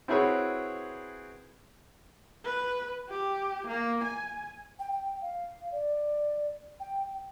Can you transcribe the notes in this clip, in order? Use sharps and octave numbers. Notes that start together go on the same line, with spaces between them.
C4 E4 F#4 G#4 B4 C#5
B4
G4
A#3
G#5
G5
G5
F5
D5
G5